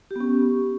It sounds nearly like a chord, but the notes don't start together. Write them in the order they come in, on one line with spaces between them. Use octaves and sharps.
G4 B3 C#4